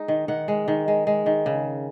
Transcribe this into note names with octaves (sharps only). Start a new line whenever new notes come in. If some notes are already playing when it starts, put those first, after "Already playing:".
Already playing: G#3 D#4
D#3
D#3 F#5
G#3
D#3
G#3
G#3
D#3
C#3